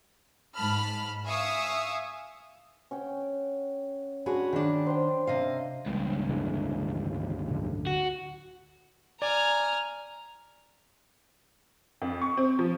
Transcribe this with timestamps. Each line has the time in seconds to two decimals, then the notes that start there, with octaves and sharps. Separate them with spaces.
0.55 G#2 A5 B5 F6
1.26 E5 F5 G#5 C#6 D#6 E6
2.91 C#4 F#5 G5
4.26 G#3 D4 F#4 G#4 F#5 B5
4.53 D#3 D4 D5 F#5
4.87 C5 G5
5.27 C3 D#5 F5
5.87 C#2 G2
6.29 D3 E3 G#3
7.48 D1 D3
7.87 F#4
9.22 D5 G#5 A#5 F6
12.02 F2
12.22 C#6
12.37 C4
12.59 F3